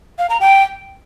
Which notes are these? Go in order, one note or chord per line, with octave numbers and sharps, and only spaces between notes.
F5
A#5
G5